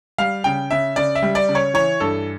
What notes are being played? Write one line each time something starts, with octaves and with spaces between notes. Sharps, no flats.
G3 F5
C#3 G5
C#3 E5
C#3 D5
E5
G3
D5
C#3
C#5
E3 C#5
G2 A4